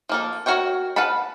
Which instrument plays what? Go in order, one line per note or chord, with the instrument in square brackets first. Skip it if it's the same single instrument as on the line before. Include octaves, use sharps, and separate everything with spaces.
[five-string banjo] F3 A#3 A4
F#4 A#4 C#5 G5
B4 F5 F#5 A5 B5